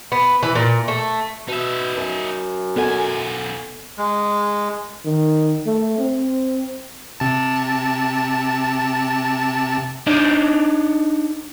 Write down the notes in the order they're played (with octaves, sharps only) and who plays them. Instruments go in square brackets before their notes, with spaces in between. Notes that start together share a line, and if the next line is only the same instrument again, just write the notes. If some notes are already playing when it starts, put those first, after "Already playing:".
[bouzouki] B3
E3
A#2
A3
[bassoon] B2 [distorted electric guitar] D#4 E5
[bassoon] F#2
[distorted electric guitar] B1 G#5 [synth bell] B3 A4 F#5
[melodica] G#3
[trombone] D#3
A3
C4
[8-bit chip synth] C3 A5
[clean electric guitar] D4 D#4 C#5 D5